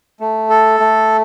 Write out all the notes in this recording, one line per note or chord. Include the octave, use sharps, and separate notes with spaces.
A3
A4
A3